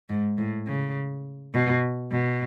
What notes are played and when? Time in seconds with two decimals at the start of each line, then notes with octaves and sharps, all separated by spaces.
0.09 G#2
0.38 A2
0.67 C#3
1.54 B2
2.11 B2